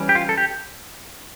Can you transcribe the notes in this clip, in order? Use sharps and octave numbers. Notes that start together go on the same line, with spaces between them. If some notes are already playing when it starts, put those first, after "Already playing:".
Already playing: E3 G3 C#4
G4
F4
A4
G4